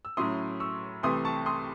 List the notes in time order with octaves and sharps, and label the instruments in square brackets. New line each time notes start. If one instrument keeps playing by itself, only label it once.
[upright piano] E6
A2 F#3 C#4 E4 C6 D#6
C#6 E6
C2 C3 E3 A3 C6 D#6
A5 C#6
C6 D#6